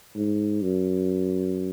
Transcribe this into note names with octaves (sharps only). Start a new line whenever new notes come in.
G#2
F#2